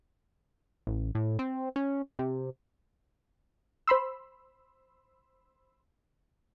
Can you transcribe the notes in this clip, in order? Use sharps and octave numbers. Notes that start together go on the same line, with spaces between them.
A1
A2
C4
C#4
C3
C5 B5 C6 E6